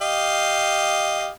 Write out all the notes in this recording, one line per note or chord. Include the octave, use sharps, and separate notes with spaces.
G4 D#5 F5